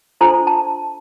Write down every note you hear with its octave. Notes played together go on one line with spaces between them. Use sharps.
D4 F4 A4 C5 A#5
A5